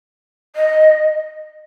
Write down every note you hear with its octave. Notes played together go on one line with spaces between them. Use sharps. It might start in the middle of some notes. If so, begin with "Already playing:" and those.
D#5